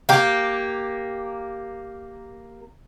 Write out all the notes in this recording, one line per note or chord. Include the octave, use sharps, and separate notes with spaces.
A#3 G4